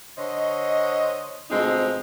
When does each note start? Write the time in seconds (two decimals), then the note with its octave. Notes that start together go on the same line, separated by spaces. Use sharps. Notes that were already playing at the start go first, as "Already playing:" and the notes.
0.17 D3 C5 C#5 D#5
1.50 D2 B2 F3 G#3 C4 D#4